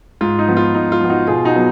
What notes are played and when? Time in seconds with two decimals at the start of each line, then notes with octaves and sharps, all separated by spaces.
0.21 G#2 F4
0.39 D#4
0.48 F3 B3
0.57 F4
0.74 G#2 D#4
0.92 F4
1.01 F3 B3
1.10 D#4 F#4
1.27 B2 F4 G#4
1.45 D#4 F#4
1.55 F#3 B3